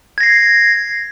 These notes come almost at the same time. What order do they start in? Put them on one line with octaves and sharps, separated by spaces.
G#6 A#6 C7